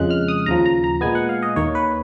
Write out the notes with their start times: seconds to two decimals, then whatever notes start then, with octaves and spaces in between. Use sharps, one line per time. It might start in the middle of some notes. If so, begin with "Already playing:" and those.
Already playing: F2 C#3 G#3 F#6
0.11 F6
0.28 D#6
0.46 D#2 C#3 F3 A#5
0.66 A#5
0.84 A#5
1.01 A#2 G#3 B3 G#5
1.15 F#5
1.29 F5
1.43 D#5
1.56 D#2 D#3 A#3 C#5
1.75 B4